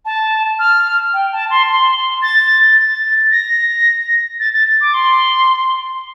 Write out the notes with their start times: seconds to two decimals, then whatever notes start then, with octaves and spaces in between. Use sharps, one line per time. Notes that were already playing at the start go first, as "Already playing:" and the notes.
0.05 A5
0.59 F6
1.14 G5
1.32 A5
1.50 C6
1.69 C6
2.22 A6
2.77 A6
3.31 A#6
4.40 A6
4.54 A6
4.81 D6
4.94 C6